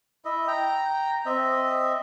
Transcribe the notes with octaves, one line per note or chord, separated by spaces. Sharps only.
E4 D#5 E5
G5 A#5
C4 D#5 E5